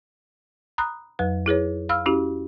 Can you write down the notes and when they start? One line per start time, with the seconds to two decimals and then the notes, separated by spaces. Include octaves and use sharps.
0.78 A#5 B5 D#6 F#6
1.19 F2 F#3 B4
1.46 E4 G#4 B4 C#5
1.89 F5 B5 E6 F6
2.06 C#4 E4 F#4 G4